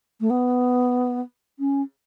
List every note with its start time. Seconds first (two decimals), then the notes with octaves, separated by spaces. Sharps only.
0.21 A3
0.30 B3
1.59 C#4